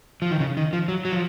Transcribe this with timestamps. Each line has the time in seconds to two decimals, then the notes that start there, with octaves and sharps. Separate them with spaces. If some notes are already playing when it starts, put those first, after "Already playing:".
0.22 F3
0.31 D#3
0.40 C#3
0.57 D#3
0.73 F3
0.88 F#3
1.05 F#3
1.12 F3